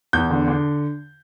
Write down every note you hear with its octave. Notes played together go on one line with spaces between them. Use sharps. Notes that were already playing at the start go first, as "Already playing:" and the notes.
E2 G6
D3
D3